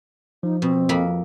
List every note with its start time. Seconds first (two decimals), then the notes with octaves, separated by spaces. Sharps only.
0.43 F3 D#4
0.62 B2 C4
0.89 F2 A#3 B5